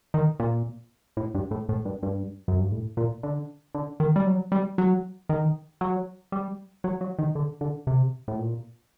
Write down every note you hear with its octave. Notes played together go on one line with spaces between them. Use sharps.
D#3
A#2
A2
G2
A2
A2
G2
G2
F#2
G2
A2
A#2
D3
D3
D#3
G3
F#3
G3
F#3
D#3
F#3
G3
F#3
F#3
D#3
D3
D3
C3
A2
A#2